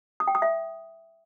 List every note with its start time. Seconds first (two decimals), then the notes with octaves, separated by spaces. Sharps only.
0.20 D#6
0.27 G5
0.35 D#6
0.42 E5